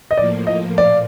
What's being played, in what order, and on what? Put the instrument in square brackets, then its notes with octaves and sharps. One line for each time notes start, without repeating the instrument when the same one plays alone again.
[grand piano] D#5
[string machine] A2 F3 A#3 [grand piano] D5
[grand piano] D#5
[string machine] A#2 [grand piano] D5